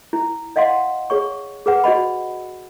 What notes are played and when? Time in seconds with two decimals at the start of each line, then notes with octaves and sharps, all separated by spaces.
0.13 E4
0.56 D5 D#5 F5 F#5 C6
1.10 G#4 C#5 C#6
1.66 G#4 B4 F#5
1.84 F#4 D5 D#5 B5